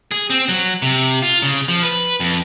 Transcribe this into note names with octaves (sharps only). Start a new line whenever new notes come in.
G#4
C4
F#3
C3
F4
C#3
F3
B4
F2